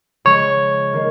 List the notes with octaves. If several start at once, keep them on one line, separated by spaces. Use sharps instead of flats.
C#3 F3 G#3 C#5
D#3 A#3